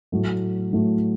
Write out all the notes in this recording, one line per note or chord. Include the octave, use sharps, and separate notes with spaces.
A2 F#3 A3
A2 F#3 A3